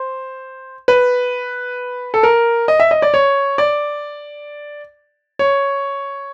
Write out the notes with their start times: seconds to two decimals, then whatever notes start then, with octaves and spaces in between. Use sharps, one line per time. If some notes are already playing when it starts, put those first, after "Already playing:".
Already playing: C5
0.88 B4
2.14 A4
2.23 A#4
2.68 D#5
2.80 E5
2.91 D#5
3.02 D5
3.14 C#5
3.58 D5
5.39 C#5